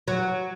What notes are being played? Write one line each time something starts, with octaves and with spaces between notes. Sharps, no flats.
F#3